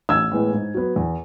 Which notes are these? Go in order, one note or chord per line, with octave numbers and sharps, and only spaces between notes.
A1 E6 G#6
A2 E3 G#3 B3
G#2
F#3 B3
E2